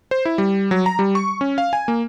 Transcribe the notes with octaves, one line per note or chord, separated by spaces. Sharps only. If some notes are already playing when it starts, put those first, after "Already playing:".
C5
E4
G3
F#3
A#5
G3
C#6
C#4
F5
G#5
A#3